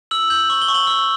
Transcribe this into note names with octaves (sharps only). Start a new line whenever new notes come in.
E6 F#7
G6 F#7
C#6 F#7
G7
C#6
F#7
E6 F#7